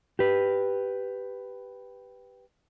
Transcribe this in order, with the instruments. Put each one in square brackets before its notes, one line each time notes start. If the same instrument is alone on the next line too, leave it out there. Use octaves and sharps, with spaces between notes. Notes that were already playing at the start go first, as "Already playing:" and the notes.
[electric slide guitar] G4 B4